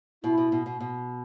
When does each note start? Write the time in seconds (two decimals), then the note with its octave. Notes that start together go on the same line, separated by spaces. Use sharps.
0.23 B2 E4
0.38 B2
0.52 B2
0.66 B2
0.80 B2